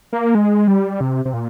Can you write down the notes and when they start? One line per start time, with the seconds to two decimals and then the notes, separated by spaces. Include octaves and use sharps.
0.13 A#3
0.35 G#3
0.67 G3
1.00 C3
1.25 C3
1.34 A#2